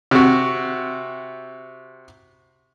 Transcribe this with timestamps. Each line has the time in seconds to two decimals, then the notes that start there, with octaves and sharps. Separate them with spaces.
0.11 C3 F#4